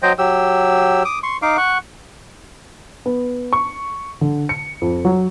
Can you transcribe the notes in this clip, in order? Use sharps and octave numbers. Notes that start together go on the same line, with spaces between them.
F#3 C5 D#5 G5
F#3 G4 E6
D6 D#6
C6 C#6
D#4 F5 D6
F#5 C#6
B3
C#6
D3
C#7
F2
F#3